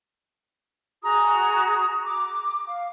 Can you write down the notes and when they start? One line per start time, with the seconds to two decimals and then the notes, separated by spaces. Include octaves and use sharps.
1.02 F#4 G#4 A#5 D#6
2.05 D6
2.68 F5